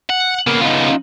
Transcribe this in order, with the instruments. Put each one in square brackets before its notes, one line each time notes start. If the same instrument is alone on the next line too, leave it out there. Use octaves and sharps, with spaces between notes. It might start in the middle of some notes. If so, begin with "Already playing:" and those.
[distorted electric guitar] F#5
[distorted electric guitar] C#3 B3 [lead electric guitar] A#3
[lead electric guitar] D#4 F4